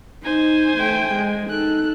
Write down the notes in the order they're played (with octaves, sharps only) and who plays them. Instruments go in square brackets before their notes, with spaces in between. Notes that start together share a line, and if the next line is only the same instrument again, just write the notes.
[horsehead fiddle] D#4 [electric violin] C5 G#5
[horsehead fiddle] A3 G5
G#3
[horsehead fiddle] D#4 A4 [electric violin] F#6